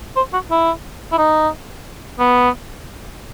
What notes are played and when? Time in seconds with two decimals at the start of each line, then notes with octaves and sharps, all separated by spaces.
0.17 C5
0.33 F#4
0.51 E4
1.12 E4
1.18 D#4
2.19 B3